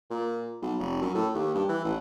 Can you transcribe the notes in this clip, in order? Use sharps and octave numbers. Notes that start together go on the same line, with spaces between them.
A#2
B1
F1
F#2
A2
D#2
G2
E3
A1